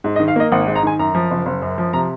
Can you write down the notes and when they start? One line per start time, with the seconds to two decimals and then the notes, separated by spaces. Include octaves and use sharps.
0.04 G#2
0.16 D#5
0.20 D#3
0.28 F5
0.36 A#3 D#5
0.52 G#1 F#5
0.67 G#2
0.76 A#5
0.83 D#3 G#5
0.99 F#2 A#5
1.15 F3
1.31 F#1
1.46 F#1
1.62 F#2
1.78 F3
1.93 C3 A#5